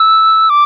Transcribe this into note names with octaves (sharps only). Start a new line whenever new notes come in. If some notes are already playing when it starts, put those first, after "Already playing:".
Already playing: E6
D6